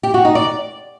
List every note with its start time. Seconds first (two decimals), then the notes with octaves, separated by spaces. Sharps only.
0.03 G4
0.14 F#4
0.25 D#4
0.35 D5